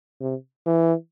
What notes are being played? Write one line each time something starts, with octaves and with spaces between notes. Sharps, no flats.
C3
E3